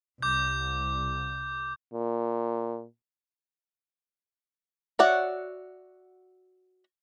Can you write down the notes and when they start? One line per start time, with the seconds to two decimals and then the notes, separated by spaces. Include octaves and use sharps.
0.22 C2 D6 G6
1.93 A#2
4.99 F#4 C#5 D5 E5 F#5